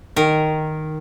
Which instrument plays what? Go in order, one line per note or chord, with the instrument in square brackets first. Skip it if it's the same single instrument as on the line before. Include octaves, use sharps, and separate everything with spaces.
[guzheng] D#3 A#4